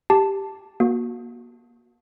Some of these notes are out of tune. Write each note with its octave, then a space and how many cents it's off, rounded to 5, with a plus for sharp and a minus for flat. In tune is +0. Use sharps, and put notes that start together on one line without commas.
G4 +0 A5 +0
A#3 +35 F#4 -15